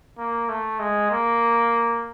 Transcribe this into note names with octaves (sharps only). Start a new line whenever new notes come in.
A#3
A3
G#3
A#3